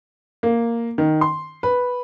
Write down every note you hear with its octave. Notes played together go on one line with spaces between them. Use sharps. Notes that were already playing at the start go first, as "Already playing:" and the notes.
A#3
D#3
C6
B4